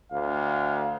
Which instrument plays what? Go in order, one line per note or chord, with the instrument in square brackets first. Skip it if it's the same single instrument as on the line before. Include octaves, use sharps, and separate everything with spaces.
[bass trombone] D2 [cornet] F5